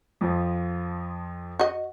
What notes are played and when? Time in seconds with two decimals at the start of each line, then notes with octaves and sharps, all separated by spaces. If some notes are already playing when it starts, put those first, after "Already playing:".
0.21 F2 F3
1.59 F#4 D#5